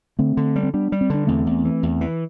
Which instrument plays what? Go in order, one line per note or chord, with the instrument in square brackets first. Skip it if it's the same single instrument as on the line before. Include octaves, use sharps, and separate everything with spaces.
[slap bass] D3 [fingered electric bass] A3 C4
[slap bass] D3
G3
[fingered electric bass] C4
[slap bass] G3 [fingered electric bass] B3 D4
[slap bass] G3
[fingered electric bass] C4
[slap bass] D3 [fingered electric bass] D4
[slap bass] E2 [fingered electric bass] A3 C4
[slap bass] E2
E3
E2
E3